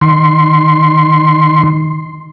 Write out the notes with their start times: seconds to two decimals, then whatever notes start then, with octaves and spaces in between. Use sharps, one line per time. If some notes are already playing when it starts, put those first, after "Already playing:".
0.01 D#3 C6